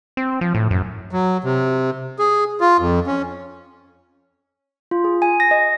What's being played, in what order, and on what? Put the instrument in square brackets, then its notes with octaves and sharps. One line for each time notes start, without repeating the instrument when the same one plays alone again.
[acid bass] C4
F3
A2
F#2
[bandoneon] F#3
C3
G#4
F4
F2
C#4
[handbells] F4
G#4
G#5
A#6
D#5